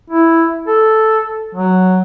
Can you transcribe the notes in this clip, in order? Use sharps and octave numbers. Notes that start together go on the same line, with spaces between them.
E4
A4
F#3